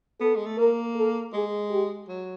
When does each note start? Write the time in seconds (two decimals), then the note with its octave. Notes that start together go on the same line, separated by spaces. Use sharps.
0.21 B3 A4
0.35 G#3
0.46 A3
0.58 A#3 A#4
0.96 A4
1.33 G#3 G#4
1.71 G4
2.08 F#3